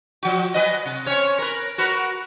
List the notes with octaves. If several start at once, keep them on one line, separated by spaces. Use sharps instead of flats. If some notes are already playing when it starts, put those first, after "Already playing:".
F3 F#4
F#3 B4 D#5
C3
C4 C#4 C#5
A#4 B4
F#4 A#4 B4